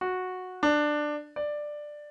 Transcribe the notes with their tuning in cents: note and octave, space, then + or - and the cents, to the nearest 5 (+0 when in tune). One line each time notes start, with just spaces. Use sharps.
F#4 -10
D4 +15
D5 +10